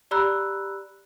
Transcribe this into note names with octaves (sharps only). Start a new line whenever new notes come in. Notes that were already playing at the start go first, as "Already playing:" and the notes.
G4 D5 A#5 B5 E6 F#6